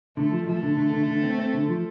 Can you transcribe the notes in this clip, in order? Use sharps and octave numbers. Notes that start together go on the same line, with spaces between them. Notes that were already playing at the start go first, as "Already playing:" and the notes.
D3 A3
F3
F3 A3
D3
D3
D3
D3
C4
C4
D3
F3